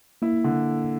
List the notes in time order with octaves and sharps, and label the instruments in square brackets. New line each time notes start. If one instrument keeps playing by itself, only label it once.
[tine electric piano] A#3 [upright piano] E4
[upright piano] D3